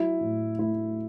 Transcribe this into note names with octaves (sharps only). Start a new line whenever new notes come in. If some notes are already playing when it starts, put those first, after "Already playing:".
Already playing: F#3 E4
A2
A3 E4